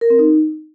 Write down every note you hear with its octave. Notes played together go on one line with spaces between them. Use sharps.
A#4
C4
D#4